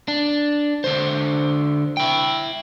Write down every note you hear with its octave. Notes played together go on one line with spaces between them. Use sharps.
D4
D3 C5
E4 G5